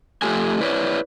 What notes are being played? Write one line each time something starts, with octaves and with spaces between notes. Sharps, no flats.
F2 F3 A3 G4 A4 G#5
E4 B4 C#5 D5